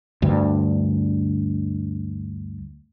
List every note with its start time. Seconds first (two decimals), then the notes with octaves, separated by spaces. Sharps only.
0.22 D2 G2